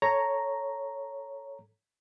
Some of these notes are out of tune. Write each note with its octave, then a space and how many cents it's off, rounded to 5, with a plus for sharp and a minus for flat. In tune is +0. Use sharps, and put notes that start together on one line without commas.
A4 +0 C#5 +0 A#5 +0